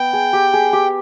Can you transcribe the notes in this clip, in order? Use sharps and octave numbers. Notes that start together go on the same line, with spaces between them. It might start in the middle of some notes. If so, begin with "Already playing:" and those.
Already playing: B3 G5
G#4
G4
G#4
G4